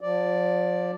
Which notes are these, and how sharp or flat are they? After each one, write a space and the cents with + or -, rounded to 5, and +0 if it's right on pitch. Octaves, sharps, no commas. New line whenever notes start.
F3 +30 D5 +0